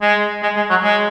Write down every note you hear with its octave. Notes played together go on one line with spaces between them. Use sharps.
G#3
G#3
G#3
F#3
G#3